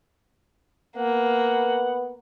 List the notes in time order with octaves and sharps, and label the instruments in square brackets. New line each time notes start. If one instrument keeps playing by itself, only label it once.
[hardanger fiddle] A#3 [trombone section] B3 [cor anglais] F#5